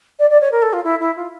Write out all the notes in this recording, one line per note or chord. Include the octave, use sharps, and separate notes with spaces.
D5
D5
C#5
A#4
A4
F4
E4
E4
F4